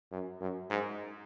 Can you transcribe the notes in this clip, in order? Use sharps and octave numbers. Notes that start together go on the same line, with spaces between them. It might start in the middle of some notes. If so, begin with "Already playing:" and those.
F#2
F#2
G#2